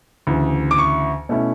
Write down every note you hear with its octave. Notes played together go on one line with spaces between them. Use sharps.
D2 C#3 E3
D6
C#6
B2 A3 C#4 E4